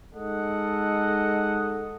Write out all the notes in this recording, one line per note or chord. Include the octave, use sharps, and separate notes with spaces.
G#3 D#4 A4 D#5 F#5